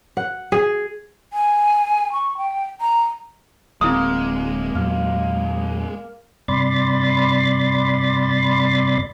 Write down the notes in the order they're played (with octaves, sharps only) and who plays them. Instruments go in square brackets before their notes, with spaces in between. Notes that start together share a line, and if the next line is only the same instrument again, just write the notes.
[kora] F#5
G#4
[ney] G#5
C#6
G5
A#5
[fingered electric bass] D1 C4 [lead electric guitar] G#3 [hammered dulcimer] A#3 [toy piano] E4 D#6
[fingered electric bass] E2 A#2 F#3 [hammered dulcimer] F5
[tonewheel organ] G2 C3 D5 B5 C6 A6